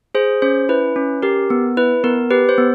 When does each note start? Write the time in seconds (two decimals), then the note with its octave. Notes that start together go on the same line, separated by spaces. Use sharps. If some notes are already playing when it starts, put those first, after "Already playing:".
0.15 G#4 C5
0.42 C#4 C5
0.69 E4 B4
0.96 C#4
1.22 G4 A#4
1.50 B3
1.77 E4 B4
2.04 B3 A#4
2.31 G4 B4
2.49 C5
2.58 B3